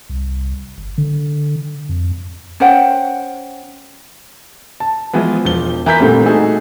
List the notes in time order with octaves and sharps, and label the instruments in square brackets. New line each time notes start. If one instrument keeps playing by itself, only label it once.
[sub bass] C2
G1
D3
F2
[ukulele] C#4 C5 F#5 G5
[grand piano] A5
E3 F3 G#3 B3
E1 F3 G7
E3 A#4 G6 B6
A#2 D3 G3 A3 C4
A3 D#4 F#4 G#4 A4